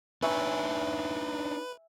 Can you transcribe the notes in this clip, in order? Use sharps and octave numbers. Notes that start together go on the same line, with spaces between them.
D4 D#4 B4 C#5 E5 G#5 C#6